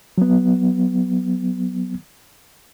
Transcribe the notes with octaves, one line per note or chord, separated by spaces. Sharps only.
F#3 B3